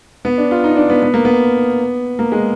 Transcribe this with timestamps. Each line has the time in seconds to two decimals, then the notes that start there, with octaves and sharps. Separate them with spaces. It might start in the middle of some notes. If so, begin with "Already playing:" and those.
0.25 B3
0.38 D4
0.51 F4
0.64 D#4
0.76 D4
0.90 B3
1.03 B3
1.14 A#3
1.25 B3
2.19 A#3
2.32 G#3